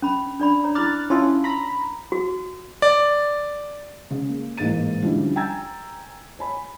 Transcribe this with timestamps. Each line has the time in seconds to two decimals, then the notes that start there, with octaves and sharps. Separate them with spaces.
0.02 C#4 B5
0.40 D4 D5 B5
0.64 C#5 A#5
0.75 E4 D6 F6 F#6 A6
1.10 C#4 E4 F4 A5 C6 E6
1.44 A#5 B5
2.12 F#4
2.82 D5
4.10 C#3
4.29 A#3
4.57 A1 G#2 A#3 A6 D#7
5.02 D3 F3 G3 C#4 E4
5.36 G5 G#5 A#5 E6 G#6 A6
6.39 C#5 G#5 B5